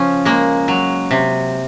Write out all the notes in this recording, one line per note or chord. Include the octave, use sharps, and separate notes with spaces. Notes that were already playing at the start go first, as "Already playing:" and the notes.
Already playing: C#3 F3 C#4
G#3 A#3
F#3
C3